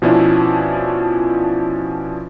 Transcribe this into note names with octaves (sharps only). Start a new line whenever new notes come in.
B2 F3 C#4 D4 E4